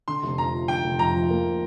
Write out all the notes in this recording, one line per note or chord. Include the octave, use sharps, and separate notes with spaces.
D3 C6
F1
F2 A#5
F3
D3 G5
F1
F2 A#5
F3
A#3